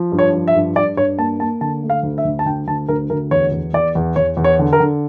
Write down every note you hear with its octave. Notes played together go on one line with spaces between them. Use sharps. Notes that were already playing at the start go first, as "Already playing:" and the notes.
Already playing: F3
G2
C#5
F3
E5
G2
G2 D5
G2 C#5
A#3 A5
A#3 A5
D3 A5
A3
F5
D2
E5
D2
A5
D2 G5
D2 A5
D2 A#4
D2 A#4
E2 C#5
E2
E2 D5
E2
E2 C#5
E2
C#5
D3
A#4
D3